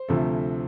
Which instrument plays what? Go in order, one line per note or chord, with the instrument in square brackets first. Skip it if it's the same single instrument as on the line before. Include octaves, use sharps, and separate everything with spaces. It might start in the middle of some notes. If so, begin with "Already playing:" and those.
Already playing: [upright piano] C5
D2 C3 F3 A3